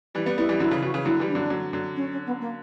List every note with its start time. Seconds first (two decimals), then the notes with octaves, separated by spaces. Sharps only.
0.15 E3 G3 E4
0.26 G3 B3
0.37 G3 B3 E4
0.49 E3 G3
0.60 D3 F#3 E4
0.71 C#3 E3
0.82 C#3 E3 F#4
0.94 C#3 E3
1.05 D3 F#3 E4
1.20 E3 G3
1.28 D4
1.35 D3 F#3
1.50 D3 F#3
1.73 D3 F#3
1.96 C#4
2.12 C#4
2.26 B3
2.41 A#3